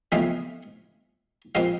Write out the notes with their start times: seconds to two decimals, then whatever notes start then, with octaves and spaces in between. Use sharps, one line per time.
0.12 E2 C#3 F3 A3 C4 D#5 F5
1.55 A#2 F3 G#3 C4 D#5 F5